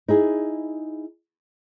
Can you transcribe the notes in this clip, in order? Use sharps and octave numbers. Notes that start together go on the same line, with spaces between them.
D#4 E4 G#4